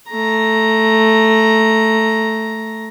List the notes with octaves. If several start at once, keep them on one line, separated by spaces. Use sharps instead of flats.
A3 A#5